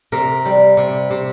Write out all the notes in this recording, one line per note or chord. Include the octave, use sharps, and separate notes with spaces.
C3 A#4
G3
C3
C3